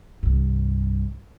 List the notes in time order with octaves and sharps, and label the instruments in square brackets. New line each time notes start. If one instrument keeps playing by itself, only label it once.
[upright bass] C2 G2